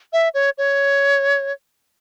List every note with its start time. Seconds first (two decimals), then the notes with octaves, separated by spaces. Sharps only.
0.13 E5
0.34 C#5
0.58 C#5